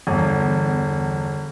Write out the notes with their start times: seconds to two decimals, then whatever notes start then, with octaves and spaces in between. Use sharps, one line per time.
0.07 G1 E2